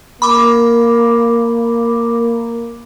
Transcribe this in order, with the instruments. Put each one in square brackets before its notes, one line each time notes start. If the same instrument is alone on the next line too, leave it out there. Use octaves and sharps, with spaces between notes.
[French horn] A#3 [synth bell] B5 D6